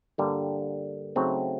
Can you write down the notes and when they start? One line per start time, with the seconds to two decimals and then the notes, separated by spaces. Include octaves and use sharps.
0.18 G2 D3 G3 A#3
1.15 C#3 F#3 A3 C4 D#4